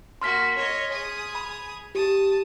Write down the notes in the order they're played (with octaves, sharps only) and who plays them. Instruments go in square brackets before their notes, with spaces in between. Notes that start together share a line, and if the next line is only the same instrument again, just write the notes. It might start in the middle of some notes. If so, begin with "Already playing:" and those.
[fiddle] A#3 F#4 [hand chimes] C6 F6 B6
[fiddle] C#5 D#5
G#4 D#6
[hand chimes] B5
[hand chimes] G4 [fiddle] A5 D#6